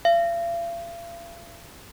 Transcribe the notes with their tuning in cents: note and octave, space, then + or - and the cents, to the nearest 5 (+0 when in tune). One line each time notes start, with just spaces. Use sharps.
F5 -45